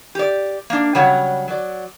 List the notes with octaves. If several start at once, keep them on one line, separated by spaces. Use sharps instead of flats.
G4 D5
A#3 D4
C#3 F#3 G3 C#5 F#5
F#3 D5